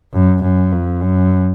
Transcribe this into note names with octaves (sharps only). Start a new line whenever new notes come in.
F#2
F#2
F2
F#2